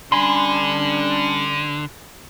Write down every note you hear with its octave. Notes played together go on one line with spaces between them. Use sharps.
D3 G3 C#4 D4 G#5 B5 C6